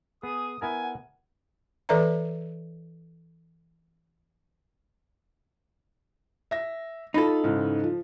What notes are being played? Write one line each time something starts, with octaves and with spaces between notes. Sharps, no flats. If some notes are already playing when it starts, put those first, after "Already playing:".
B3 G#4 D#6
B3 E4 A#4 F#5 G#5
F#5
E3 A4 B4 D5 E5 A#5
E5 A#6
D#4 F4 A4 B5
G#2 C#3 E3
F3